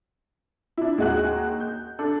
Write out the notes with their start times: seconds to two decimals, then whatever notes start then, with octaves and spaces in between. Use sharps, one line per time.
0.77 D4 E4
0.98 D#2 G#3 D#4 F#4 G#5 F#6
1.60 G6
1.99 D4 A4